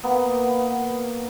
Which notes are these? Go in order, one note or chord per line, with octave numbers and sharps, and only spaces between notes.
A#3 B3